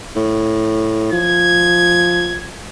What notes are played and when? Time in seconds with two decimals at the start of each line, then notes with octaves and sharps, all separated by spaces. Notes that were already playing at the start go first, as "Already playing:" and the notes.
0.16 A2
1.13 F3 G#6